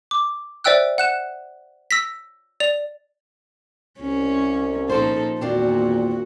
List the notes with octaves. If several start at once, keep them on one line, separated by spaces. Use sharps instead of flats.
D6
C5 D5 E5 G5 E6 F#6
F#5 F#6 E7
E6 A#6 B6
D5 F7
C2 C#4
A#2 F3 D#4 A4 A#4 C5
G#1 E2 A#2 C4 D4 F4 F#4